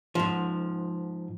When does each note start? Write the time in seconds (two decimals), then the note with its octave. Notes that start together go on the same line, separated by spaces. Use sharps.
0.15 G#2 F3